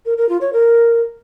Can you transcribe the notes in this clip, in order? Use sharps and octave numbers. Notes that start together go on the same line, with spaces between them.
A#4
A#4
F4
C#5
A#4